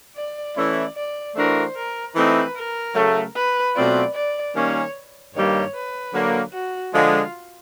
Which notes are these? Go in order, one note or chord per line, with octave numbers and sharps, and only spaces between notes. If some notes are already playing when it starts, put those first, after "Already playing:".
D5
E3 A3 C#4 E4 D5
D5
E3 A3 D4 F#4 A#4 C5
A#4
E3 A3 C4 D#4 B4
A#4
C#3 F#3 A3
B4
B2 F#3 A3 C4 F4 D5
D5
D#3 G3 A#3 C#4 C#5
G2 D#3 G3 A#3 C#5
B4
D3 F#3 A#3
F#4
D3 F3 G#3 F4